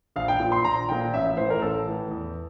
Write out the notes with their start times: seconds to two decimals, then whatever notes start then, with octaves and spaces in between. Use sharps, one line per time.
0.16 A#1 F5
0.28 G5
0.40 A#2 F3
0.52 C6
0.65 A#1 A#5
0.89 A#2 F3 G5
1.13 A1 E5
1.26 E5
1.37 A2 E3 C5
1.50 A#4
1.62 A1 A4
1.86 A2 E3
2.11 E2